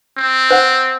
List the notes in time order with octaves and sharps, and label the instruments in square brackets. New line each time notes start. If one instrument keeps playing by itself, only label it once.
[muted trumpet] C4
[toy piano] C5 F#5